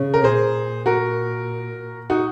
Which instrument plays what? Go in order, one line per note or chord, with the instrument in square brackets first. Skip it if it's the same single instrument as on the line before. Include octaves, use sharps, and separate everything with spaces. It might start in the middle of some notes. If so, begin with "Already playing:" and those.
Already playing: [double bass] C#3
[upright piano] A#4
[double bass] A#2 [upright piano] G#4 C5
[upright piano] F#4 A#4
D#4 F#4